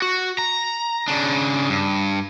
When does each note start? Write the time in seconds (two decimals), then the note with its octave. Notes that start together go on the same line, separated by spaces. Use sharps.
0.02 F#4
0.39 A#5
1.08 C#3 D4
1.69 G2